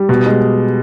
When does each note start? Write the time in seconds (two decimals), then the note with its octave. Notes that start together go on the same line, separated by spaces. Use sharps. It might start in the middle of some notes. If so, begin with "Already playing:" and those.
Already playing: G3
0.09 B2
0.26 G#3